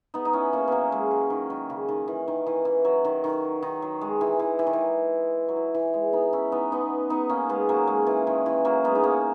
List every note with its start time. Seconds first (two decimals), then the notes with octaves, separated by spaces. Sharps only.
0.14 B3 D#4
0.25 D#4
0.33 C#4 E4
0.53 A#3 C#4
0.68 F#3 A#3 B3
0.92 G#3
1.11 F#3
1.30 D#3
1.50 D#3
1.70 C#3
1.89 D#3
2.08 E3
2.28 D#3
2.47 E3
2.65 E3
2.85 F#3
3.05 D#3
3.24 D#3
3.63 D#3
3.82 F#3
4.01 G#3
4.21 E3
4.39 E3
4.59 E3
4.67 D#3
4.73 E3
5.49 F#3
5.56 E3
5.74 E3
5.94 G#3
6.13 B3 D#4
6.33 C#4 E4
6.52 B3 D#4
6.72 B3 D#4
7.10 B3 D#4
7.29 A#3 C#4
7.49 G#3 B3
7.69 F#3 A#3
7.87 G#3
8.07 E3
8.27 D#3
8.46 E3
8.65 F#3 A#3
8.84 G#3 B3
8.95 D#4
9.04 A#3 C#4